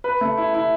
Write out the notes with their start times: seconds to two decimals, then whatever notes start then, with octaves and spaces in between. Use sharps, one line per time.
0.04 B4
0.21 A3
0.37 E4
0.54 E4